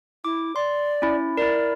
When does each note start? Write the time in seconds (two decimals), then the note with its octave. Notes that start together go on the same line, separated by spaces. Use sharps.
0.25 E4 D6
0.56 D5 C6
1.02 C#4 E4
1.37 E4 A#4 D5